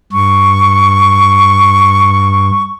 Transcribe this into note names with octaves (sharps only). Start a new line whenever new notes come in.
G2 C#6